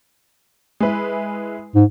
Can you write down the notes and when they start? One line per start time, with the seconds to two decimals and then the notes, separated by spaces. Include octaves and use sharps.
0.80 G#3 E4 B4
1.75 G#2